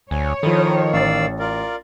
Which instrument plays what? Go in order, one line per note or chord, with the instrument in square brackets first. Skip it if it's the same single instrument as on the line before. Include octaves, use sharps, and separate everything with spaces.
[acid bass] D2 [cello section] C#5 [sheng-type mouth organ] G#5
[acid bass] D#3 [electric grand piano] F3 A4 [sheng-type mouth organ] E4 D#6
[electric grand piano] A1 A6 [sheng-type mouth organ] D5 F5 E6
[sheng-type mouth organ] F4 A#4 D5